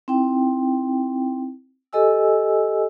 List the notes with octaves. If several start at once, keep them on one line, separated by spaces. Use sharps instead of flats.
C4 D#4 E4 G5
G4 A4 D#5 G#5 E6